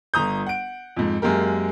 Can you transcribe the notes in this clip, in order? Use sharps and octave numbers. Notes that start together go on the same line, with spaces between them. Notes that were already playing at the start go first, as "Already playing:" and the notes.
G1 A#5 D#6 G6
F#5 D7
F2 G#2
F#2 G#3 A#3 G4 A#4